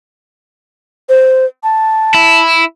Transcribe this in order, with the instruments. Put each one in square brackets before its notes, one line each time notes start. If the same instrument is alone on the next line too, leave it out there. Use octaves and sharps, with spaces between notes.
[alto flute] C5
A5
[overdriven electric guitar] E4